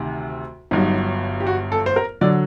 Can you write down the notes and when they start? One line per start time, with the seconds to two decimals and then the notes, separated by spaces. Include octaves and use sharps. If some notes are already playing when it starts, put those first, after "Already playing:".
Already playing: D2 C3 D#3
0.71 G1 G2 F#3 D#4
1.40 G4
1.47 F#4
1.72 A4
1.86 C5
1.96 A#4
2.21 D3 F#3 D5